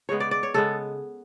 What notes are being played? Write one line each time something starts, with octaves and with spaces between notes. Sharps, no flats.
C#3 G#3 B3 C#5
D5
D5
C#5
C#3 G#3 B3 A4